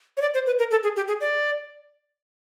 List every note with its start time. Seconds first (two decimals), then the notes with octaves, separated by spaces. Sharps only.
0.17 C#5
0.21 D5
0.34 C5
0.46 B4
0.59 A#4
0.71 A4
0.83 G#4
0.96 G4
1.08 G#4
1.21 D5